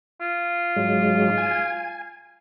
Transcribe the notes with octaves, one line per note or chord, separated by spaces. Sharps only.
F4
G#2 F#3 G#3
G#5